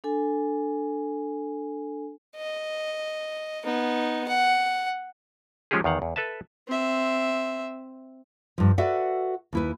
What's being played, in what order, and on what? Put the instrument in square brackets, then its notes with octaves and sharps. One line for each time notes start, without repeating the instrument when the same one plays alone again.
[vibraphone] D4 A4 G#5
[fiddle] D#5
B3 D#4
F#5
[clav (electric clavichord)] F3 G#3 C#4 F4 G4 G#4
E2 D#3 F5 F#5
E2
A4 B4 E5 A5
[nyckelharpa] C4 E5
[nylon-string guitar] G2 F3
F#4 A4 B4 D5 E5 F#5
D#2 E4 B4